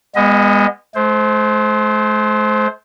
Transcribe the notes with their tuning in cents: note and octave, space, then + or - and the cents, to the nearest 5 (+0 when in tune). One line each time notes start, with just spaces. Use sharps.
G#3 -35 B3 -5 D#5 +20
A3 -45 C5 +0